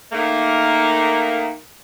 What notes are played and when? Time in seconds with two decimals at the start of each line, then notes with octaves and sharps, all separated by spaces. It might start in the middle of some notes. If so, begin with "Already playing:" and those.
0.12 D#3 A3 A#3